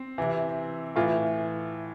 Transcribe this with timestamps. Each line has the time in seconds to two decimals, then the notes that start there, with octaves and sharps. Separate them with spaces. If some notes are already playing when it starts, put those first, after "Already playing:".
Already playing: C4
0.18 C3 E3
0.96 A2 E3 F4